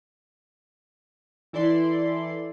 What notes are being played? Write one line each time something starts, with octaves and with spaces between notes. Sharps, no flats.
E3 E4 A4 D5 C6